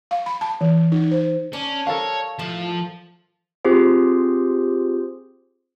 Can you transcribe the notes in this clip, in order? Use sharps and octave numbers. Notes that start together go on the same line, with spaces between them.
F5
B5
A5
E3
D#4
C5
C#4 D4
A4 A#4 C#5 F5
A2 F3 A5
C4 F4 G4 G#4 C5